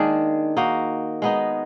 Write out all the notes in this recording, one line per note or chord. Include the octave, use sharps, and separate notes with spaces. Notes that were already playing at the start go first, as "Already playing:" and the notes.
Already playing: D#3 G#3 A#3 D4 G#4
A#3 D#4 F#4
G#3 B3 D#4